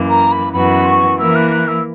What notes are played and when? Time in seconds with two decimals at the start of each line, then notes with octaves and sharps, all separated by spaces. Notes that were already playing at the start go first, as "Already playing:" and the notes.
Already playing: F#2 E3 A#3
0.09 A#5
0.31 B5
0.52 F#2 E3 B3 F#4 B5
0.86 C#6
1.18 E3 A#3 E4 A#4 E6
1.35 F#6
1.51 F#6
1.67 E6